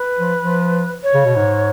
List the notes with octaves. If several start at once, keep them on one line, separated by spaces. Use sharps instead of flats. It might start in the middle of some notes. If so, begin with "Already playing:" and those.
Already playing: B4
F3
F3
C#5
C#3
B2
G#2